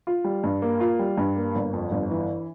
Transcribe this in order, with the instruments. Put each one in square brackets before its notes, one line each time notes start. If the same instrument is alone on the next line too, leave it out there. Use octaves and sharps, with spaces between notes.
[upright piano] F4
G3
G2
A#3
F4
G3
G2
A#3
G1
F2
G1
E3